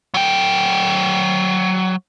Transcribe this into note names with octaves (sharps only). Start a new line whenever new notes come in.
F#3 G5